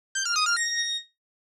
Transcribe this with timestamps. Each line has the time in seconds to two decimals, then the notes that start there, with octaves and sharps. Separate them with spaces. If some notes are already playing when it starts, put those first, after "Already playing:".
0.15 G6
0.25 F6
0.36 D#6
0.46 F6
0.57 A#6